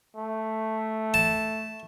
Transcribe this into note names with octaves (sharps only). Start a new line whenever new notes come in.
A3
A5